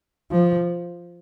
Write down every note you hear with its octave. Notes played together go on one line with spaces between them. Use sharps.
F3